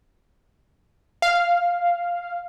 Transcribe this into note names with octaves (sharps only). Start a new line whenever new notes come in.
F5